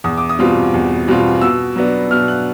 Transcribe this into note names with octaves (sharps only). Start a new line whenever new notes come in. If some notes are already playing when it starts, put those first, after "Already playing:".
E2 D#6
D6
D#6
B2 G3 C4 F4
E2
B2 G3 C4 F4
B2 E6
F#3 B3 D4
B2 F6
F#6